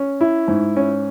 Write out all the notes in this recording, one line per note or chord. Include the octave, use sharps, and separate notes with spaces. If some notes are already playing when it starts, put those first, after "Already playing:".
Already playing: C#4
E4
G#2
C#4